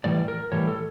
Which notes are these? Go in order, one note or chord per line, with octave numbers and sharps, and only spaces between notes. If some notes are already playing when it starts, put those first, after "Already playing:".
A2 E3 G3 D5
A#4
A2 E3 G3 C#5
A4